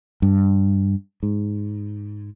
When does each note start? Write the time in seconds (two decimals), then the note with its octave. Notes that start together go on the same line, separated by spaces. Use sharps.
0.22 G2
1.23 G#2